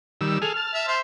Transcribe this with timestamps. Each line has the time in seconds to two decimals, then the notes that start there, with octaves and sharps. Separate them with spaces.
0.21 D#3 G3 E6
0.42 G#4 A4 F6
0.57 A5
0.74 E5
0.88 C5 E5